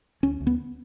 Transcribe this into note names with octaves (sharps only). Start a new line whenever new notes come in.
D2 C#4
D2
B3